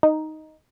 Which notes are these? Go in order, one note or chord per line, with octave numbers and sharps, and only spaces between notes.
D#4